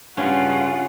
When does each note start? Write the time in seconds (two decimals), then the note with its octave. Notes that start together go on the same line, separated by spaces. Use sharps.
0.17 G2 C#3 C#4 F4 F#5